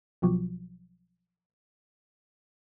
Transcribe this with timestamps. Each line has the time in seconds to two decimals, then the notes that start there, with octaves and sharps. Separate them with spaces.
0.22 B1 B2 F3 F#3